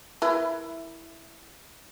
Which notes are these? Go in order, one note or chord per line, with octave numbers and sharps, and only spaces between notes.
E4 A#4 B4